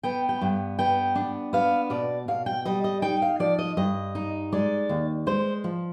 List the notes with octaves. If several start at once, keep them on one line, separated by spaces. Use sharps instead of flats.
B3 G5
G5
G2
B3 G5
D4
B3 F5
B2 D5
B2 F5
G5
G3 D#5
D#5
D#4 G5
F5
F3 D5
D#5
G2 D#5
D#4
G#3 D5
D#2
G#3 C5
F3